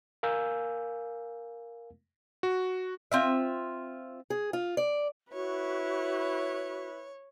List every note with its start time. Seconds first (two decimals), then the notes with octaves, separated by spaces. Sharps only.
0.23 A#4 F5 G#5 E6 G6
2.43 F#4
3.12 C4 F4 E5
4.30 G#4
4.53 F4
4.77 D5
5.33 E4 F#4 B4 C#5